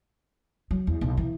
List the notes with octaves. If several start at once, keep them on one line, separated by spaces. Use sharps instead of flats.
F#3
E2
B1
E3